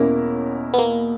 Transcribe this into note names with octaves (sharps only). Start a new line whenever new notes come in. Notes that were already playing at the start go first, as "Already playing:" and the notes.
Already playing: E2 B2 A#3 C#4 E4 A#4
B3
A#3